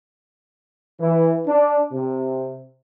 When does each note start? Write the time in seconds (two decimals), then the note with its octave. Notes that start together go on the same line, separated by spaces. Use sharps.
0.99 E3
1.46 D4
1.92 C3